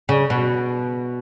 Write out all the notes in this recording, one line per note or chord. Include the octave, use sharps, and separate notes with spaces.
C#3
B2